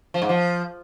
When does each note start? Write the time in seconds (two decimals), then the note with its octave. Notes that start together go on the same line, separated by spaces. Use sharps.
0.14 F3
0.22 G#2
0.29 F3